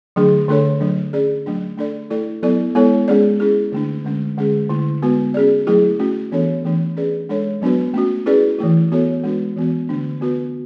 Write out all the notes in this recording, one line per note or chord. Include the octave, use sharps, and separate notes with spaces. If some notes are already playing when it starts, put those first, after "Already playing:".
D3 F#3 A3 D4 G#4
D3 A3 D4 A4 C#5
F#3 A3 D4
C#4 G#4 D5
F#3 A3 D4
A3 D4 A4 D5
A3 E4 A4 D5
F#3 B3 E4 A4 D5
G#3 B3 E4 A4 C#5
G#3 C#4 G#4 D5
C#4 E4 G#4
D3 A3 D4
D3 G#3 C#4
D3 G#3 C#4 G#4
D3 A3 E4
G#3 B3 F#4 B4
C#4 G#4 D5
F#3 A3 E4 G#4
A3 C#4 F#4
E3 B3 D4 A4 C#5
E3 A3 D4
C#4 G#4 B4 D5
G#3 D4 A4 C#5
F#3 B3 D4 F#4 B4
A3 C#4 F#4
C#4 E4 G#4 B4 D5
E3 A3 E4
B3 F#4 A4 C#5
G#3 D4 F#4 B4
E3 B3 F#4
D3 A3 D4
B3 F#4 B4